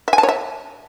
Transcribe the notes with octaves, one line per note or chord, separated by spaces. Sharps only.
E5
G#5
A5
C#5
E5